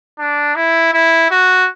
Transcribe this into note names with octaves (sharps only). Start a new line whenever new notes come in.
D4
E4
E4
F#4